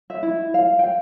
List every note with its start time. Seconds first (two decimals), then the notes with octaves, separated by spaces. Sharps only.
0.10 E5
0.23 E4
0.54 F5
0.79 G5